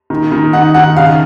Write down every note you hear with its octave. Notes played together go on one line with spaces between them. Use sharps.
D#3
D#3
D#4 F#5
D#3 F#5
C#3 F5